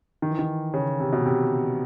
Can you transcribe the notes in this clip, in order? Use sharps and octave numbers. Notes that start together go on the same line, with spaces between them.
D#3
E3
D#3
C#3
C3
B2
C3